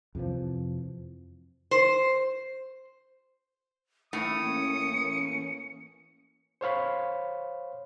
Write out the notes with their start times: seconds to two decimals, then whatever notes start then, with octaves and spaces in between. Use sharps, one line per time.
0.15 F2 C3 E3 F3
1.71 C5
4.13 A2 E3 A#3 C#4 D#6 C#7
6.61 C5 C#5 F5 B5